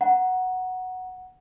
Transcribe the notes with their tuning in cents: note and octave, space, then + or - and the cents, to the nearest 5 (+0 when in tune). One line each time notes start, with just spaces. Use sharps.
F#5 +0 A#5 +25